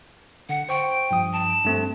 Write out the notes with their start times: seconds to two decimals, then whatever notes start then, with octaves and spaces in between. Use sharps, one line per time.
0.49 D3 F#5
0.69 C5 G5 C#6
1.11 G2 F3 D#6
1.33 A5
1.65 G2 A3 C4